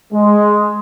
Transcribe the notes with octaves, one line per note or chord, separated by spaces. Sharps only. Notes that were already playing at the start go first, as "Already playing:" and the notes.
G#3